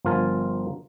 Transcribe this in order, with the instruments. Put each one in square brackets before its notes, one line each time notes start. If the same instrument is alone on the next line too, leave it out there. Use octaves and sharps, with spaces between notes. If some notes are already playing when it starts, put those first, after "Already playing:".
[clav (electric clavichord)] G1 F3 F4 A#4 G#5 A5